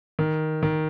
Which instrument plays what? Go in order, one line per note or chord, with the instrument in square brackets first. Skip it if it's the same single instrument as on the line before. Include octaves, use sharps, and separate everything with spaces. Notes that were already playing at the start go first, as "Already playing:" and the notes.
[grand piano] D#3
D#3